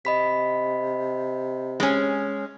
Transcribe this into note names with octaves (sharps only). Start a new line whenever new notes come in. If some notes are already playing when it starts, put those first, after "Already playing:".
C3 D#5 B5 B6
G#3 C#4